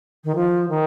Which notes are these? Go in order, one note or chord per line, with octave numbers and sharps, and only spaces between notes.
D#3
F3
D#3